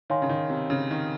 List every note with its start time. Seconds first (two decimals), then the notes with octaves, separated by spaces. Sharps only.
0.10 D#3 C#5 F5 G#5 C6
0.22 C#3
0.29 D#3
0.50 C3
0.70 C#3
0.91 D#3